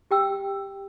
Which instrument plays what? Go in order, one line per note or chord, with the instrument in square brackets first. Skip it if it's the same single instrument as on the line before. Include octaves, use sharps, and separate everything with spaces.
[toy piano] G4 G5 E6